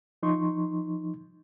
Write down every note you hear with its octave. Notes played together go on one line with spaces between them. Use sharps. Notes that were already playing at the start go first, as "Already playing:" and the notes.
F3 D#4 C6 C#6